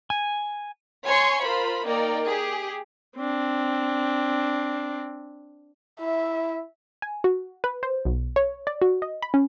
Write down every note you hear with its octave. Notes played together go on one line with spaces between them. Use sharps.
G#5
C#5 G#5 C6 C#6
F4 A#4 C5 B5
A#3 D#4 A#4 D5 G5
G4 G#4
C4 D4
E4 E5
G#5
F#4
B4
C5
B1
C#5
D5
F#4
D#5
B5
C#4